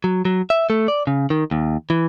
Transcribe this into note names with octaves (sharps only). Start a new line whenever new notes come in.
F#3
F#3
E5
A3
D5
C#3
D#3
D#2
E3